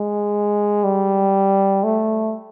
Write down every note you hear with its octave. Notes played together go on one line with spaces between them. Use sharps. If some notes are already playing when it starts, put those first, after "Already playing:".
Already playing: G#3
G3
A3